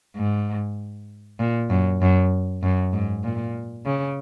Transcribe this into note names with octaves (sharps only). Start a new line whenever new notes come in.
G#2
A#2
F#2
F#2
F#2
G#2
A#2
C#3